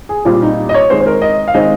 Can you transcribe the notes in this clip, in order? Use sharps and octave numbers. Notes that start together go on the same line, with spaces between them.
G#4
A#2 G3 C4 F4
D#4
D#5
C#5
D#3 G#3 C4 C5
C5
A#4
D#5
F5
D#3 G#3 C4 D#5